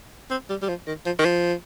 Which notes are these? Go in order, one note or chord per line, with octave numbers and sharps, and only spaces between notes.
C4
G3
G3
F3
D#3
F3
D#3
F3